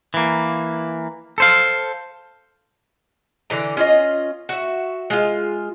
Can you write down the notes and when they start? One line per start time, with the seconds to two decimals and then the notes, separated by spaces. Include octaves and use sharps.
0.14 E3 A#3
1.38 A4 C5 F5
3.50 D3 E3 A#5
3.77 C#4 F4 D#5
4.49 F#4 E5
5.10 G#3 F4